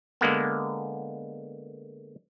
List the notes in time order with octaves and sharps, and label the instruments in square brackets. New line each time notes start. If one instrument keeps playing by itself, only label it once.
[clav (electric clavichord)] D3 G#3 A#3 B3